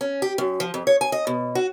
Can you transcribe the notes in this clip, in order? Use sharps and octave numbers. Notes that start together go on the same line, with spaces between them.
C#4
G4
F#2
F3
F2
C#5
G#5
D#5
B2
F#4